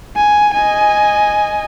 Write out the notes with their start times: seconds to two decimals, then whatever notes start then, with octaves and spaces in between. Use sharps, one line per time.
0.16 G#5
0.54 D#5 G#5